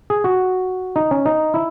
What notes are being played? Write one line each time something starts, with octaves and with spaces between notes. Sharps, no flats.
G#4
F#4
D#4
C#4
D#4
E4